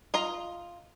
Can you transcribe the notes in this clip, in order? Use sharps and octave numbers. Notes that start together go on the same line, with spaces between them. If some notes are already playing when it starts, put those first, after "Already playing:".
F4 D#5 A#5